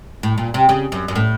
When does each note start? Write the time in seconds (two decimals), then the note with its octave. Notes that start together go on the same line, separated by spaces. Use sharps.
0.23 A2
0.38 A#2
0.54 C3
0.69 C#3
0.92 F#2
1.08 F#2
1.15 A2